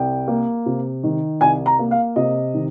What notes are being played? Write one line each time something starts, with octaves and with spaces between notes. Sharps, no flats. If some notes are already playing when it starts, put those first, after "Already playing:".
Already playing: C2 G5
A#3
C3
D#3
C2 G#5
A#5
A#3
F5
C3 D#5
D#3